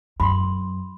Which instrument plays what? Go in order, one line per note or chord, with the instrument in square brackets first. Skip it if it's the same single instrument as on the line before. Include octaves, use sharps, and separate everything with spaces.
[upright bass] F#2 [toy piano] B5 C6